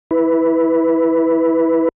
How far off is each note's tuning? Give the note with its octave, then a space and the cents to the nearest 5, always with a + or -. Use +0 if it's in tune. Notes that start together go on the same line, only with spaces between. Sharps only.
E4 -10 B4 +0